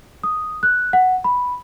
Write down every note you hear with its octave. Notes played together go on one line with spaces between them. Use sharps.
D#6
F#6
F#5
B5